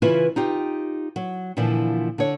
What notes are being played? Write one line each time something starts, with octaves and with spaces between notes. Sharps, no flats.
C#3 E3 E4 F4 B4
D#4 F4 G4
F#3
A#2 D3 E3 F3
D3 C#5